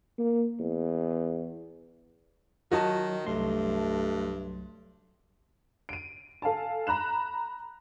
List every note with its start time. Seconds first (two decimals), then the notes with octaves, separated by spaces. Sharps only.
0.19 A#3
0.60 E2
2.72 D#3 F#3 F#4 D#5 A5
3.27 C2 G2 F#3 A3 C6
5.89 D7 D#7
6.42 A4 F5 G#5 A5
6.87 A#5 B5 F#6 E7